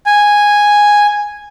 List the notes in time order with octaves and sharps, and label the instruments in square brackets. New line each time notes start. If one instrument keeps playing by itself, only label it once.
[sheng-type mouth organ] G#5